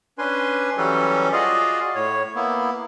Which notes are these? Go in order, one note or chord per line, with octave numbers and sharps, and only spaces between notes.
C#4 D4 B4 G#5 C6
E3 F#3 G3 C#4 G4 A4
F4 F#4 G#4 D5 D#5 F5
A2 C#5
A#3 B3 E4